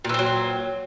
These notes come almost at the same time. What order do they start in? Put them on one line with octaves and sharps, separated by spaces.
A#2 E3 C4 F#3